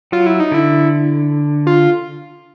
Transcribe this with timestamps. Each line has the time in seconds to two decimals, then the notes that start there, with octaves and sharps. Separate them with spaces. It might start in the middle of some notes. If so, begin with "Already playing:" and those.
0.12 F#3 F4
0.26 E4
0.40 D#4
0.52 D3 E4
1.67 F4